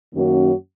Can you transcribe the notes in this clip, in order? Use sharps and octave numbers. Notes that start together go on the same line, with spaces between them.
F#2 D#3 A#3 C#4 F#4